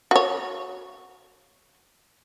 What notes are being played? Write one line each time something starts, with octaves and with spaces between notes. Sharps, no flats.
F#4 C#5